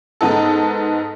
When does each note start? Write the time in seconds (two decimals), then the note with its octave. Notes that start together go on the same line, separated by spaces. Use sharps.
0.21 G#2 B3 D#4 A4